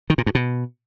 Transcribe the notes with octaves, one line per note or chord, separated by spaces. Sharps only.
D#3
A#2
G2
B2